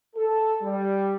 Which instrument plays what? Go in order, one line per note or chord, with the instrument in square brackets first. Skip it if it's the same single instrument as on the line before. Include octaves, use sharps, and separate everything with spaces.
[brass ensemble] A4
G3